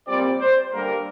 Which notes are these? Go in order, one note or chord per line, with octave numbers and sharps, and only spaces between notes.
A#2 G3 C4 D5
C5
D3 G3 A#3 A#4